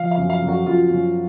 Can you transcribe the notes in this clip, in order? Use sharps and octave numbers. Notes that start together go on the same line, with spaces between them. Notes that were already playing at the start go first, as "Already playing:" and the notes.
Already playing: F3 F5
F5
F#2
F5
F#2
F#4
F#2 F4
F#2